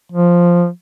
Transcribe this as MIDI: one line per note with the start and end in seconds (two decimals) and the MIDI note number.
0.12 0.68 53